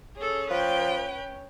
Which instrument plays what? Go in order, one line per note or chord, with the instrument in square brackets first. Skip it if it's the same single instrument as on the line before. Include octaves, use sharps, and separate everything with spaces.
[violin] C#4 C#5 [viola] G#4 A4
[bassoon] F3 [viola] B4 G5